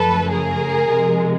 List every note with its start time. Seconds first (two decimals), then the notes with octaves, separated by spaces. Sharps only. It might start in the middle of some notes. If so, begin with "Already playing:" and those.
Already playing: F#2 C#3 F3 A3 A4 B4
0.31 G#4 A#4
0.90 C3 F3 G#3